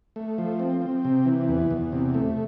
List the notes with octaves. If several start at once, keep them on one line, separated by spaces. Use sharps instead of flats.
A3
F3
C4
C4
C3
E3
E2
E2
C3
A3